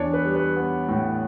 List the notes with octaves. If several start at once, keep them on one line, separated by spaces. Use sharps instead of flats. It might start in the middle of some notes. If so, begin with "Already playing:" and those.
Already playing: E2 D4 C#5
B4
G3
B4
B3
A2